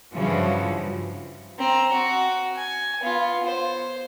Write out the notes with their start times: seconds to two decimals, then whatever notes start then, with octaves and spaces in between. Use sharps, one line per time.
0.12 G2 C#3 E3 F3 F#4
1.58 C4 A#5
1.92 F#4
2.57 G#5
3.02 B3 F4
3.46 C5